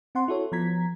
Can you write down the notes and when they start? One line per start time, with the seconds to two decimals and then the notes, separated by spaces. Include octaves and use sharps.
0.15 C4 F#5 C6
0.28 E4 F#4 A4 C#5
0.52 F3 B3 A#5 G#6 B6